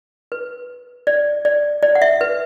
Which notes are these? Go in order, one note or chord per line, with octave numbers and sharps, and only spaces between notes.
B4
D5
D5
D5
F#5
E5
B4